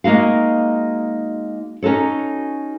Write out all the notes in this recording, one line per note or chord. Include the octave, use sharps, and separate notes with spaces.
G#3 A#3 D#4 F#4 F5
C#4 D#4 F#4 A4 C#5